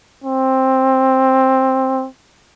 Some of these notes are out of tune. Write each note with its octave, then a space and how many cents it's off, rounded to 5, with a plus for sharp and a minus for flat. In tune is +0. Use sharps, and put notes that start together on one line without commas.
C4 +10